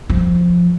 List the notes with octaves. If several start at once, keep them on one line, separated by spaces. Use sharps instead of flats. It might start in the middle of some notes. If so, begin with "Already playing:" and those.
F3